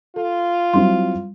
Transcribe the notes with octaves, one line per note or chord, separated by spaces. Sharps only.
F4 A4
F#3 G3 C4 E4 C6